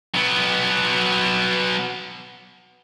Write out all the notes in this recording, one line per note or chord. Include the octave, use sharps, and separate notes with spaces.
F#3 B3